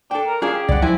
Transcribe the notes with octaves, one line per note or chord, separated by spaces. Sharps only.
D4 A4 G5
A#4
C#4 D4 F4 G#4 F5
G4
C#2 G3 D5 F#5
F3 F#3 C4 E4 G#5